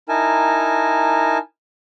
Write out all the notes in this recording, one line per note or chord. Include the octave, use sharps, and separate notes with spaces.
D#4 E4 A#4 G#5 A5